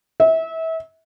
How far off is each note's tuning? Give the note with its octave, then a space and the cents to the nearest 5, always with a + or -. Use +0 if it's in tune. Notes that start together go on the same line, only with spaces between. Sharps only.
E5 -30